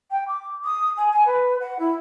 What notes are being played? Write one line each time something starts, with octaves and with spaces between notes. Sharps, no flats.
G5
D6
D#6
G#5
G#5
B4
F#5
E4